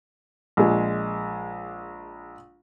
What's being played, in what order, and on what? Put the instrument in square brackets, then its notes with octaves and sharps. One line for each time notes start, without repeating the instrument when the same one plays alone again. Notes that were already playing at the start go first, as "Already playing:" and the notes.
[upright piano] A#1 G#3